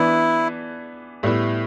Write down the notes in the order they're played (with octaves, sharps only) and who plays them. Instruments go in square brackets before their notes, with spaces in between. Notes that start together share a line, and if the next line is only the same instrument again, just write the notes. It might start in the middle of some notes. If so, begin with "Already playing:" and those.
Already playing: [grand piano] E3 B3 D4 [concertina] E4
[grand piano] A2 G3 B3 E4